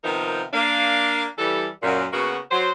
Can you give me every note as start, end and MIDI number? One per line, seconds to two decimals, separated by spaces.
0.03 0.42 48
0.03 0.42 51
0.03 0.42 53
0.03 0.42 59
0.03 0.42 63
0.03 0.42 70
0.52 1.24 58
0.52 1.24 62
0.52 1.24 77
1.38 1.67 52
1.38 1.67 55
1.38 1.67 69
1.83 2.05 42
1.83 2.05 46
2.12 2.37 49
2.12 2.37 58
2.12 2.37 59
2.12 2.37 66
2.51 2.69 54
2.51 2.69 72